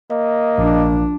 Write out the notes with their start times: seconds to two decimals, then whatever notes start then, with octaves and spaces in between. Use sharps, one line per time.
0.11 A#3 D#5
0.58 A#1 F3 D4